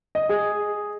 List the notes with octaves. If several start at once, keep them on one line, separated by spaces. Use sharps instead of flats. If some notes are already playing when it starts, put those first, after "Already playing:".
D#5
G#4